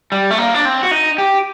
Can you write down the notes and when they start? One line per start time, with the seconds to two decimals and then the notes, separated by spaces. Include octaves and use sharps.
0.12 G3
0.31 A3
0.38 A#3
0.54 D4
0.65 C4
0.83 F#4
0.91 D#4
1.18 G4